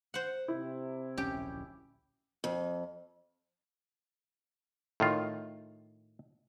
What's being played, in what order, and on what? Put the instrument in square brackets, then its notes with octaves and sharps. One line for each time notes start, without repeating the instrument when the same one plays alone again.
[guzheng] C5 F#5
[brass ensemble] C3 [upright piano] E4
[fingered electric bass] D1 A#1 C#4 [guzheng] G4
[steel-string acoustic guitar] F2
[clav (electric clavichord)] A2 D#3 F4